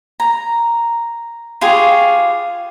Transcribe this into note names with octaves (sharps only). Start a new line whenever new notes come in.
A#5
F4 G4 G#4 C#6